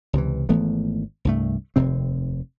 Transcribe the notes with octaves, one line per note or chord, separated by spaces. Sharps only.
C#2 C3 E3
G#1 E3 A3 B3
C2 G2 A3
F1 D#2 C3 C4